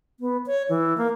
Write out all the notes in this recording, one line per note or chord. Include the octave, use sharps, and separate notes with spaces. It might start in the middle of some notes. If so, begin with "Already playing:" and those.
B3
C#5
E3
A#3